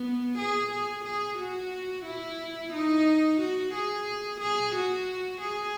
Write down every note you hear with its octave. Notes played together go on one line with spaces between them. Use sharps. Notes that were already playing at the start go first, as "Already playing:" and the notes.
Already playing: B3
G#4
G#4
G#4
F#4
E4
D#4
F#4
G#4
G#4
F#4
G#4